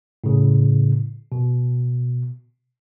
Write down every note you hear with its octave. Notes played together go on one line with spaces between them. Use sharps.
A2 C#3
B2